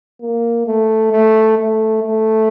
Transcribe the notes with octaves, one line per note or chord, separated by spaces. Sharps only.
A#3
A3
A3
A3
A3